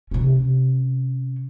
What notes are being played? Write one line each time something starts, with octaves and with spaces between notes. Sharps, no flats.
C3 C#4